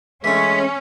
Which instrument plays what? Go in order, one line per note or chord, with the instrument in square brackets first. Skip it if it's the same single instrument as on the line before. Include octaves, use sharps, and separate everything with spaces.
[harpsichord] E3 A3 [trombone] G#3 [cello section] C#4 [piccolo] B6